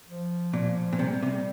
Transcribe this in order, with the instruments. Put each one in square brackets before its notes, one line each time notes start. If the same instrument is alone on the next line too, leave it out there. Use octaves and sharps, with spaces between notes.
[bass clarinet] F3
[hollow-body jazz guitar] A#2
A#2
[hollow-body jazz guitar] C3 [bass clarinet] G3
[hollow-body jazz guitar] C3